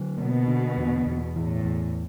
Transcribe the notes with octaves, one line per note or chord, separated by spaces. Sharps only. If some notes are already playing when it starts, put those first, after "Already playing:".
Already playing: D3 F#3
B2 A#3
D3
E2
E2
A2 E3
E2